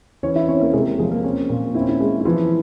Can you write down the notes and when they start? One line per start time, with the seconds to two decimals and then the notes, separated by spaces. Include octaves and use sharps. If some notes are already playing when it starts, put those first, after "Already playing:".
0.23 E3 C#4 C#5
0.35 E4 E5
0.48 C4 C#4 C#5
0.61 A#3 A#4
0.73 C3 G#3 G#4
0.99 F3 G#3 G#4
1.11 A#3 A#4
1.24 C4 C#4
1.49 A#2
1.74 C4 E4
1.81 C#4
1.89 E4
2.00 G#3
2.20 E4
2.25 E3 F3 F4